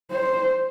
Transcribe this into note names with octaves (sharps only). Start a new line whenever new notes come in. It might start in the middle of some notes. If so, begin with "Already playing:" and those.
C5